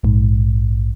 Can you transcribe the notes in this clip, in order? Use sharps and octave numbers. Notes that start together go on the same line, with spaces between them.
A#1 G#2